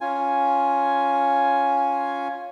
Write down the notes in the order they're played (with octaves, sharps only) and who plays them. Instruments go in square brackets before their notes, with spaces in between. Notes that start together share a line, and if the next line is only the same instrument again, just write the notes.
[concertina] C#4 F4 G#5